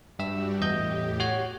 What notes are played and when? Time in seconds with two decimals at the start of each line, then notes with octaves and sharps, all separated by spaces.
0.19 G2 G3 F#4 G4 E5 E6
0.61 E2 A2 G4 D#5 G6
1.20 F#4 C#5